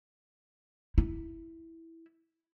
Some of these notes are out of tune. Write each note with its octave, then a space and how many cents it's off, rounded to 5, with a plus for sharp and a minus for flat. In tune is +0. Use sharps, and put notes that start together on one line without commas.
E4 -5